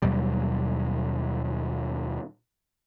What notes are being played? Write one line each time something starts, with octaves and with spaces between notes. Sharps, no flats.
D#2 B2 F#3 G3